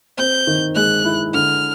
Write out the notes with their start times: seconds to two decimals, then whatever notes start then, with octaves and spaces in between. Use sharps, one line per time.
0.18 C4 G6
0.47 D#3
0.76 G#3 F#6
1.05 E4
1.34 D3 F6